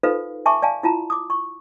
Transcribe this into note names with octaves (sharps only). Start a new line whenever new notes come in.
D#4 F4 A4 B4 C5 F5
E5 G#5 A5 C#6 D6
D5 F5 G#5 A5
E4 F4 A5 A#5
D6 D#6
C#6